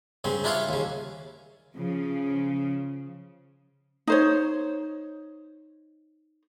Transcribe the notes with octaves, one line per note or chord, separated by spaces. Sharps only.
G2 C#3 C4
D4 E4 F4 C#5 F5
D#2 C#3
C#3 F3
D#4 C5 C#5